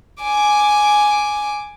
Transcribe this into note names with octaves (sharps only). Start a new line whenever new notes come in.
G#5 D6